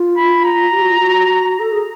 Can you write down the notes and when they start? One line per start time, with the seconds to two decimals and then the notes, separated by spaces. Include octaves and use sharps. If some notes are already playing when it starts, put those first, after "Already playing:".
Already playing: F4
0.17 B5
0.44 A#5
0.72 G4
0.81 F#4
0.91 F4
1.00 F#4
1.60 A4
1.72 G#4